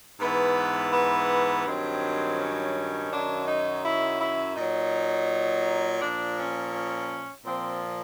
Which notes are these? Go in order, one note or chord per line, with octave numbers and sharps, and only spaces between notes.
G#2 E3 B3
B3
G2 D#3 F#3 C4
C#4
F#2 D#3 F#3 D4
D#4
E4
E4
A#2 F#3 D#4
A#2 F3 D4
C#4
C#4
A#2 F3 C4